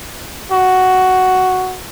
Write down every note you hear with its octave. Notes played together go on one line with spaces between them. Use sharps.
F#4